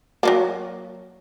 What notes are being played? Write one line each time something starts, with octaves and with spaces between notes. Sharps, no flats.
F#3 G3 A#3